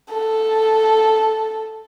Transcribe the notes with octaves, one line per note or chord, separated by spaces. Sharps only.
A4